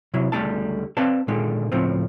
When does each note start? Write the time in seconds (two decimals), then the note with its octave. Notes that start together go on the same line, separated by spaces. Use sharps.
0.14 C3 F#3 E4
0.32 C#2 D3 G3 A3 E4 A5
0.97 C4 B4 D5 F5 A5
1.28 A#2 D3 D#3 G#3
1.72 C#2 A2 F3 C4